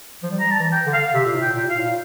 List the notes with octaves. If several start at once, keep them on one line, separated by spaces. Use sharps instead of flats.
F3
G3
A#5
A5
E3
G5
D3
F5
C3 E5
A#2
A2
G5
A#2
F5
A2
A#2